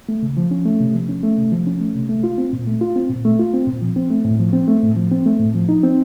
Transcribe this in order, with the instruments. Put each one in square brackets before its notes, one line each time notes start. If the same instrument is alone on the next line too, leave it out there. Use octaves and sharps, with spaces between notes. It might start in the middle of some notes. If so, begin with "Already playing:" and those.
[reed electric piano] A3
C#3
F3
C#4
A3
C3
F3
C#4
A3
C3
F3
C#4
A3
C3
A3
F4
C4
A#2
A3
F4
C4
A#2
A3
F4
C4
A#2
F3
C4
A3
A2
F3
C4
A3
A2
F3
C4
A3
A2
F3
D#4
C4